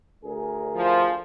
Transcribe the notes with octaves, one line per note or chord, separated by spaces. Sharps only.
D2 G#4 A#4
F3